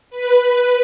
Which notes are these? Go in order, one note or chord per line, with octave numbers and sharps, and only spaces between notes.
B4